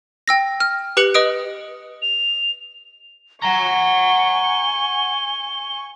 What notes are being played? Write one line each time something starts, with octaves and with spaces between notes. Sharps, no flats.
G5 E6 A#6
F6
G4 B4 F#6 C#7 F#7
B4 D#5 D#6 D7
F7
F#5 G#5 A#5 C#6 G7